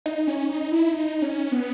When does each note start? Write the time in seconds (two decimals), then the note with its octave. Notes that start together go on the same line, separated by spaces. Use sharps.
0.06 D#4
0.27 C#4
0.49 D#4
0.72 E4
0.93 D#4
1.22 C#4
1.52 B3